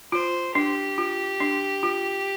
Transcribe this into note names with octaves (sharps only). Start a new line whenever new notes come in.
F4 C5
D4 G4
F4
D4
F4